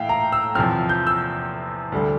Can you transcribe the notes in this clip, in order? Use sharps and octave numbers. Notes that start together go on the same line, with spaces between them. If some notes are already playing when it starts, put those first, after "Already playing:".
Already playing: A2 E3 E5 F5 G5
A#5
E6
E2 C3 F3 C4 F6
G6
E6
D2 D3 G3